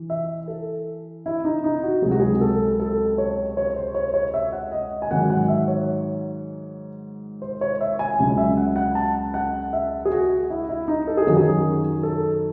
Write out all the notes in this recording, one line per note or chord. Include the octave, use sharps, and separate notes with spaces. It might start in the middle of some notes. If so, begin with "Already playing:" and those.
Already playing: E3
E5
A4
E4
D#4
D#4
F#4
C#2 C3 F#3 G#4
F#4
G#4
A4
A4
C#5
C#5
C5
C#5
C#5
E5
F#5
D#5
G#5
G#2 D#3 F#3 F#5
F#5
E5
C#5
C5
C#5
E5
G#5
C#2 C#3 F#3
E5
F#5
F#5
A5
F#5
E5
G#4
F#4
E4
E4
D#4
A4
G#4
F#2 D#3 F#3 F#4
G#4
A4